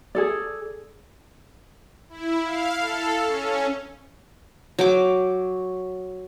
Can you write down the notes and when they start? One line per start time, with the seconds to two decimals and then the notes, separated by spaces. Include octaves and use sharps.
0.15 G#4 A4 D5
2.09 E4
2.44 F5
2.80 A4
3.25 C#4
4.79 F#3 G5 D6